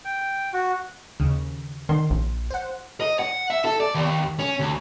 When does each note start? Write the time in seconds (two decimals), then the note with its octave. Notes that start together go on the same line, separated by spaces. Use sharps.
0.05 G5
0.53 F#4
1.20 D#2 C#3
1.89 D#3 C6
2.10 A#1
2.50 C5 F#5
3.01 D#5
3.19 F#5
3.50 E5
3.65 A4
3.80 D5
3.95 D#2
4.39 C#4
4.59 D2